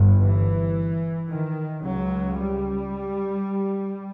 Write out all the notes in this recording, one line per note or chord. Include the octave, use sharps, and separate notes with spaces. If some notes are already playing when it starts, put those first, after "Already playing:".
Already playing: G1 G2
E3
D#3
C#2 C#3 F#3
G3